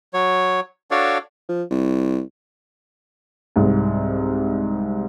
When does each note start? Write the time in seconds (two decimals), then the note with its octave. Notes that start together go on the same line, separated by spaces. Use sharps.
0.14 F#3 C#5
0.91 D4 F#4 A4 C#5 D5 F5
1.49 F3
1.70 C2
3.56 C2 G#2